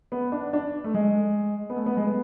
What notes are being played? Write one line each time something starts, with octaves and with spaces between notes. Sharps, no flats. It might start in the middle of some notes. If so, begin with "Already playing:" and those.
B3
D4
D4
A3
G#3
B3
A3
B3
G#3
B3